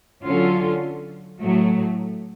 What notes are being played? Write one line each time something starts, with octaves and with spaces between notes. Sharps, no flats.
D3 F#3 C#4 F4 A4
A2 F#3 A3